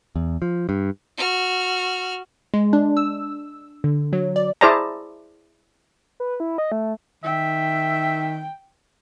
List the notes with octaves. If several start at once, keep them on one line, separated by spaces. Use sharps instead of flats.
E2
F3
G2
F#4 F6
G#3
D4
E6
D3
F#3
D5
E4 G#4 C5 D5 A5 A#5
B4
E4
D#5
A3
D#3 E5 G5